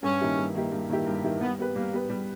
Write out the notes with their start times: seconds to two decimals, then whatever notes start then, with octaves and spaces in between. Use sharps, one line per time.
0.03 G2 C#4
0.21 D#3 A#3 E4 G4
0.37 G2
0.55 D#3 A#3 E4 G4
0.72 G2
0.89 D#3 A#3 E4 G4
1.07 G2
1.24 D#3 A#3 E4 G4
1.41 G3 B3
1.59 B3 G4 B4
1.76 G3 A#3
1.93 B3 G4 B4
2.10 G3